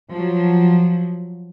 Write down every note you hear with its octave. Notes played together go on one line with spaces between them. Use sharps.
F3 F#3